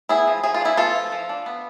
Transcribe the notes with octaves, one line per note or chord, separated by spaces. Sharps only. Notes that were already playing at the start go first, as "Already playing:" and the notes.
B3 E4 G#4
F3
F3 G#4
F4
D4 E4 G#4
B3 F4 A4
F3
F3
D4
B3